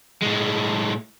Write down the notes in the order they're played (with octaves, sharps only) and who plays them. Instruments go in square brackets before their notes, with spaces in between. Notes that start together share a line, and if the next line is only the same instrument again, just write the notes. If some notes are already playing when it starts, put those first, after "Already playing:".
[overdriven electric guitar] A2 G#3